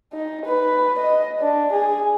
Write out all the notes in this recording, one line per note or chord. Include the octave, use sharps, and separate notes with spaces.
D#4
B4
D#5
D4
G#4